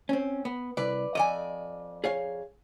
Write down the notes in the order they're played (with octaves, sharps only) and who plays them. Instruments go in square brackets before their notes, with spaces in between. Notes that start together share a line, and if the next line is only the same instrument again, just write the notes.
[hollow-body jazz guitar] C4 C#4
B3
[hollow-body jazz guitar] C2 [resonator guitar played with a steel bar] B4 D5
[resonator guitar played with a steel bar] F2 D5 G#5 [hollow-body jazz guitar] D#5
[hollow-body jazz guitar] G#4 C#5 F5